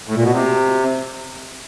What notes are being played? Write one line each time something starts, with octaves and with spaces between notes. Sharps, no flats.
A2
A#2
B2
C3